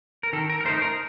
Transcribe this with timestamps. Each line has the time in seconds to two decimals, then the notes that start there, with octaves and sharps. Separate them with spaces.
0.23 A#4
0.33 D#3 A4
0.50 A#4
0.61 A#4
0.65 A3 C5
0.69 D#4
0.82 A#4